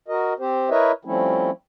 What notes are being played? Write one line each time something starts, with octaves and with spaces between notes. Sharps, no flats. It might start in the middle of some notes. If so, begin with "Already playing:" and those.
F#4 A#4 D#5
C4 G4 C5
E4 A#4 B4 C#5 D#5 E5
F3 G3 A3 C4 C#4 E4